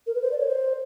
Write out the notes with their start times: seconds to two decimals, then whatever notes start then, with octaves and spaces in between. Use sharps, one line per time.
0.06 A#4
0.14 B4
0.21 C5
0.31 D5
0.38 C#5
0.48 C5